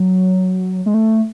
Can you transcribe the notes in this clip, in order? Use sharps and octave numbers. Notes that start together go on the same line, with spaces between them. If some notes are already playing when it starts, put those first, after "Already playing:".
Already playing: F#3
G#3
A3